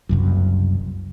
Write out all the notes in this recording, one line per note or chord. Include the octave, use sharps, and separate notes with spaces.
F#1 C2 F#2